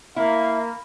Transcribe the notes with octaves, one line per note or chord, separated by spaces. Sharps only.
A#3 E4 F5